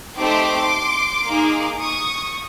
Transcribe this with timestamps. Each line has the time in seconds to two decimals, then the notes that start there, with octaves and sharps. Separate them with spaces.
0.17 A3 C4 D#4 G4 C6 D6
1.26 A#3 D#4 G#4
1.80 C#6 D#6